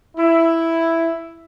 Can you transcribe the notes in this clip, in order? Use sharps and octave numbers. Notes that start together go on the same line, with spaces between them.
E4